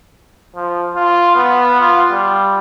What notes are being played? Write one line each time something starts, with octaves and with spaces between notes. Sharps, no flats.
F3
F4
B3
F4
G3